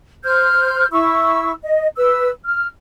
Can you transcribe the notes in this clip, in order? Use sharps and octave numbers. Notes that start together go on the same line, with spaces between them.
C5 F6 G6
E4 C#6 E6
D#5
B4 E6
F6